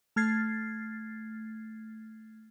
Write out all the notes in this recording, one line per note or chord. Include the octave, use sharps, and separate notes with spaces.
A3 F6 G#6 A6 C7